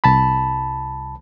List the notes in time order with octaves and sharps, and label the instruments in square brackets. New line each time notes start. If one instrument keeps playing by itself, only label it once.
[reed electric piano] C2 A5 B5